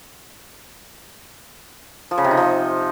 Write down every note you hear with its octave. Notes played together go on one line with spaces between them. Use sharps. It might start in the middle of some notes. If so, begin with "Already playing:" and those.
F3
C#3
C3
D#4
F3